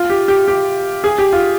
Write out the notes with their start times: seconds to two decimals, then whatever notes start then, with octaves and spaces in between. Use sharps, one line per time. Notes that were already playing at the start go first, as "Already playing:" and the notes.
Already playing: F4
0.10 G4
0.28 G4
0.48 G4
1.04 G#4
1.18 G4
1.33 F4